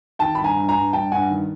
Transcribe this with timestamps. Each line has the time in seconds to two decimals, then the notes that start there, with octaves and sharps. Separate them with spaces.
0.19 D#3 G5 A5
0.35 G2 B5
0.44 G#5 A#5
0.56 G2
0.68 G#5 A#5
0.75 G2
0.93 G2 G5 A5
1.12 G2 F#5 G#5
1.30 D#3